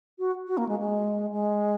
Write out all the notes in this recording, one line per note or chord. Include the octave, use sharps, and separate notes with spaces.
F#4
F#4
A#3
G#3
G#3
G#3